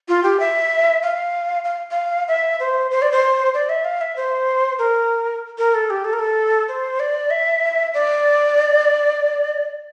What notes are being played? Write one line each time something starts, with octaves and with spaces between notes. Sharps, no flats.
F4
G4
E5
F5
F5
F5
E5
C5
C5
D5
C5
D5
E5
F5
E5
C5
A#4
A#4
A4
G4
A4
A#4
A4
C5
D5
E5
D5